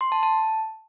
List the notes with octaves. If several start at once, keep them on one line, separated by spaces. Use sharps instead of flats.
C6
A5
A5